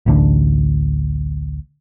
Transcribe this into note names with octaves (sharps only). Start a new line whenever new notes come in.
A1 D2 D4